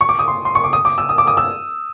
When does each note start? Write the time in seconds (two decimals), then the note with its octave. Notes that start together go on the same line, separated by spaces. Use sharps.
0.01 C#6
0.09 D6
0.19 D#6
0.28 C6
0.45 C6
0.55 C#6
0.64 D6
0.73 D#6
0.85 D6
0.98 E6
1.09 D#6
1.18 D6
1.27 D#6
1.37 E6